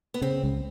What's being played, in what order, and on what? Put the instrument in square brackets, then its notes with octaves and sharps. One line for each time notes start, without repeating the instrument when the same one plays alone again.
[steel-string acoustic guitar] B3
[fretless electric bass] C#3 [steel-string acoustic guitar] C4
[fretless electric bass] C#2